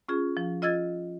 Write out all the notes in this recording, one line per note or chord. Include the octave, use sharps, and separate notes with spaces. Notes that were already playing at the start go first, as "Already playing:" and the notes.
C#4 F4 G#4
F3
F4 D#5 E6 G#6 A6